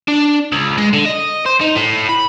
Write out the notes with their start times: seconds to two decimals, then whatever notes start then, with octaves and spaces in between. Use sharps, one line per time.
0.08 D4
0.52 C#2
0.78 G#3
0.93 D3
1.05 D#5
1.46 C5
1.61 D#4
1.75 A2
2.09 B5